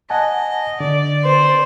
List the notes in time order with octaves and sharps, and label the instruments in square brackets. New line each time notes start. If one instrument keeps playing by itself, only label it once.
[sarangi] D#5 [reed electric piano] F#5 G#5 A5
[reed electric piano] D3 [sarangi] D5
[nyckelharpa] C5